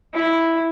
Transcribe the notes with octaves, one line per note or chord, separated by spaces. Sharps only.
E4